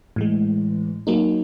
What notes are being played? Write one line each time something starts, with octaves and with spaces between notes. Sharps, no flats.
A2 E3 G#3
F#3 A#3 D#4